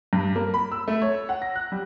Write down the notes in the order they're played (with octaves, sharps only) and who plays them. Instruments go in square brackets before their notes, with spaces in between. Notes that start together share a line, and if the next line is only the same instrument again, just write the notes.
[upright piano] G2
A#3
B5
E6
A3
C#5
F#5
A#6
F#6
G3